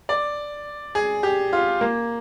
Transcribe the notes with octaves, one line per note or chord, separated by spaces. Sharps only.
D5
G#4
G4
F4
A#3